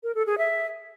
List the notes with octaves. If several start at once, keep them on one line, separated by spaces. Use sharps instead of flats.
A#4
A4
G#4
E5